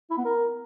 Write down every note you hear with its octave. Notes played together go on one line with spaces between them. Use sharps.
E4
B3
A#4